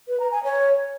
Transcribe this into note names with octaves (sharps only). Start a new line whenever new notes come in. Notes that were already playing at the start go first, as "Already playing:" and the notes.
B4
A#5
G#5
C#5